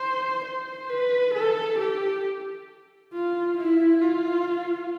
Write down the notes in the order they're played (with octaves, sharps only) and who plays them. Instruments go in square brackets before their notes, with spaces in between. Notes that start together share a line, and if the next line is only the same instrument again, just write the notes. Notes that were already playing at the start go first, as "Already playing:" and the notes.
Already playing: [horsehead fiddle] C5
C5
B4
A4
G4
F4
E4
F4